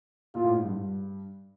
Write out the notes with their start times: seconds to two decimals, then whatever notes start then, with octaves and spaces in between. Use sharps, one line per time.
0.35 A#2 F4
0.44 A2
0.54 G#2
0.64 G2